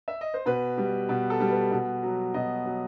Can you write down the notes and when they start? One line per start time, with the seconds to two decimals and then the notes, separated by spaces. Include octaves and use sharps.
0.08 E5
0.21 D#5
0.34 C5
0.46 B2 B4
0.78 G3
1.09 B2
1.30 A4
1.40 G3
1.51 B4
1.72 B2
2.03 F#3
2.34 B2 D#5
2.66 F#3